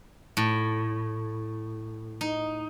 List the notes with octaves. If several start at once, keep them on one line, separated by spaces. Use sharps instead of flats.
A2
D#4